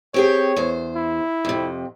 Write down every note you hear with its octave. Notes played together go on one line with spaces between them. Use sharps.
C4 G4 G#4 C#5
E2 C5
E4
F2 C3